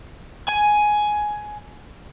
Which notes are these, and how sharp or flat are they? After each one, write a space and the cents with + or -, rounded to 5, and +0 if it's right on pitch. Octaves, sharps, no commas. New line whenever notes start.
G#5 +10